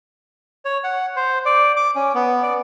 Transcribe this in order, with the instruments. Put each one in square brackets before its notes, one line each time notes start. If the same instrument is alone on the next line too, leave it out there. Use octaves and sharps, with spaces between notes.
[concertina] C#5
F#5
C5
D5
D6
C#4
B3
D5